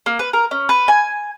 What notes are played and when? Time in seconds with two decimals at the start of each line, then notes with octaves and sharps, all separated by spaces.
0.06 A#3
0.19 B4
0.33 A#4
0.51 C#4
0.69 B4
0.88 G#5